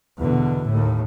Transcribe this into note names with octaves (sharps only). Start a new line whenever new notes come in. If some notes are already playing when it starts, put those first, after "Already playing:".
E2 B2 D3
D#2 A2